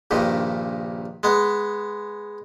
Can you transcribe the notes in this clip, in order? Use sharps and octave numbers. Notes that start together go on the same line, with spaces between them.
A#1 G2 A#2 D#3
G#3 B3